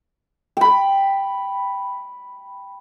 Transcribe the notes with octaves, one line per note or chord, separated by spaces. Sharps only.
G5 B5